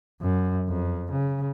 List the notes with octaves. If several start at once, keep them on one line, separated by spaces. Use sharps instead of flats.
F#2
F2
C#3